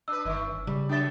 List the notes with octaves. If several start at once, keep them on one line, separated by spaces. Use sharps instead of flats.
D4 B4 E6
G1 D#3 G#3 A3
C#4
C#3 G3
F#3 D4 A4 E5 A6